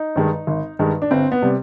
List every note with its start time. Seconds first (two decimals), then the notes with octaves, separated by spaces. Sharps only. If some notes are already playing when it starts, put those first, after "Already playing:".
Already playing: D#4
0.16 G2 D#3 G#3
0.47 G#1
0.79 G2 D#3 G#3
1.02 D4
1.11 G1 C4
1.32 B3
1.42 C3 G3